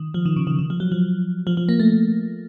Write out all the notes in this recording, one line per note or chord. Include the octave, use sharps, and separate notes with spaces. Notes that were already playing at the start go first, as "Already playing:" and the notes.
Already playing: D#3
F3
D#3
C#3
D#3
D#3
F3
F#3
F3
F3
F3
A#3
A3